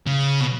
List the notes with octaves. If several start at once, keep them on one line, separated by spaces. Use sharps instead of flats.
C#3
B2